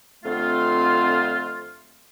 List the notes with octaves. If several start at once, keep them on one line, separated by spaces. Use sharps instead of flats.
F2 D3 A3 C4 F4